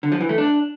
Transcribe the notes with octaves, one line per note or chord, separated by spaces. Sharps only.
D3
F3
E3
A3
D4